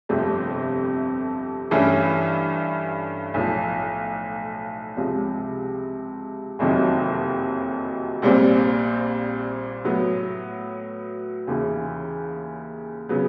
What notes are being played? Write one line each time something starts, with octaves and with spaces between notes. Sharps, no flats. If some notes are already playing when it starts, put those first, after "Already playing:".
G1 F2 C3 F3 A3
G2 E3 A3 C#4
B1 A2 F3
C#2 C3 F3
F#1 F2 C3 D#3 F#3
A#1 A#2 G3 C4
A2 F#3 B3
D#2 C#3 E3
C#3 F#3 B3